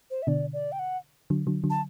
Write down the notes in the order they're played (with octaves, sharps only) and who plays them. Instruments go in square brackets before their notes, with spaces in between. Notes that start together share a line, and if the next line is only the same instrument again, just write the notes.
[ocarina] C5
E5
[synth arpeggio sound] B2 D3 [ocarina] D5
[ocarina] D5
G5
F#5
[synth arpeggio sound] D3 F#3
D3 F#3
D3 F#3
[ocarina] A5